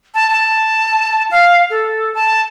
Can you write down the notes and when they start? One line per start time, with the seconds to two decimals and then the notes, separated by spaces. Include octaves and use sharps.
0.15 A5
0.30 A5
1.31 F5
1.70 A4
2.15 A5